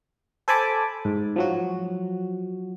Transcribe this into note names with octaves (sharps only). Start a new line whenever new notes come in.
A4 C5 G#5 A5 B5 D6
G#2
F3 F#3 F#4